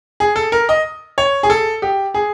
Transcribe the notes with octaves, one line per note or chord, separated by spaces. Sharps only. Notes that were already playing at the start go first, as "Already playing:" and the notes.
G#4
A4
A#4
D#5
C#5
G#4
A4
G4
G#4